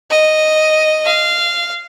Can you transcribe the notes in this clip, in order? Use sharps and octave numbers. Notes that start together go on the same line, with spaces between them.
D#5
F5